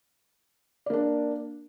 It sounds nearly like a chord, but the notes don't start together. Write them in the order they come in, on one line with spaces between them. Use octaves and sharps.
D5 A#3 D4